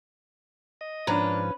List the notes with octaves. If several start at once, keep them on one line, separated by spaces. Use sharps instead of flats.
D#5
G#2 F3 C#4 D4 B4 A#5